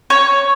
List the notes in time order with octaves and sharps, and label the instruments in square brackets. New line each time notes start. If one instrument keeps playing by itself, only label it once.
[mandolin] C#5